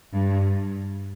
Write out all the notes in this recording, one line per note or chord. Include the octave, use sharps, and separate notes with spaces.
G2